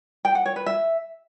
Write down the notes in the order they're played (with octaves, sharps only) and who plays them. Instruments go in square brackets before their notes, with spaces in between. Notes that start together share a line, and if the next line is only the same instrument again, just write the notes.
[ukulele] G5
F#5
C#5
B4
E5